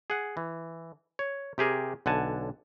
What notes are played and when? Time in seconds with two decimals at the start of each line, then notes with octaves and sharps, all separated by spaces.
0.10 G#4 F#5
0.37 E3
1.19 C#5
1.58 C3 G4 G#4 A#4
2.06 B1 D3 F#5 G#5 A5